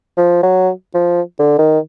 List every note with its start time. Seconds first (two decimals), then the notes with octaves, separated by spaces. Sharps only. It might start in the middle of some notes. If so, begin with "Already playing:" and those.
0.17 F3
0.43 F#3
0.94 F3
1.39 D3
1.59 D#3